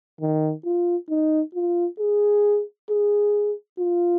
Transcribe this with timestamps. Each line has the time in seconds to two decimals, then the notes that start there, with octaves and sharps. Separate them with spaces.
0.21 D#3
0.65 F4
1.10 D#4
1.55 F4
1.99 G#4
2.90 G#4
3.79 F4